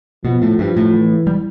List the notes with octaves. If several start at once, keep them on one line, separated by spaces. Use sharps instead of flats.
B2 F3
A2
G2 F3
A2
E3
G3